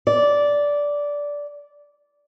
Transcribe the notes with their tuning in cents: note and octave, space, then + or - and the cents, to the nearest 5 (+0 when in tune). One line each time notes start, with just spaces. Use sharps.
D5 -10